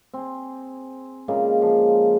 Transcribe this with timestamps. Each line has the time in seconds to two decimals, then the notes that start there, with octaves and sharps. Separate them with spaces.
0.14 C4 G#4
1.28 A#2 C#3 G#3 A#3
1.62 F3